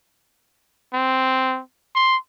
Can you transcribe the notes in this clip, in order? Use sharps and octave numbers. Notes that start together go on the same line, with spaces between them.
C4
C6